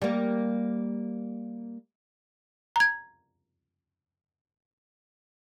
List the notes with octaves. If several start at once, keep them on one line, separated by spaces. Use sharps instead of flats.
G3 A#3
A#5 G#6